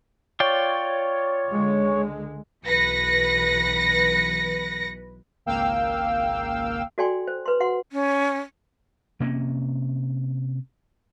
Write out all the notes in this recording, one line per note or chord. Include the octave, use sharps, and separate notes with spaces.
F4 C#5 D5 G5
C#2 D3 G#3
B1 E3 B4 A#6 C#7
G#1 C#2 A#3 F5 G5 E6
F#4 A4 D5 G5 G#5 C6
C5
B4 C6
F#4 F#5 C6
C#4
C3 A#3 B3 C#4